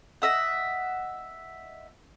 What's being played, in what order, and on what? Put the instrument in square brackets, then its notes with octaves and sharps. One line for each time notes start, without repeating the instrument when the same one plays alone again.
[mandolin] D#5 E5 F#5